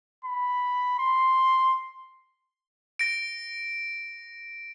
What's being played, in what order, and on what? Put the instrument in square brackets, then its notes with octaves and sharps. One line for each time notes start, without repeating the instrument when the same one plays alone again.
[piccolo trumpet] B5
C6
[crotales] A#6 D7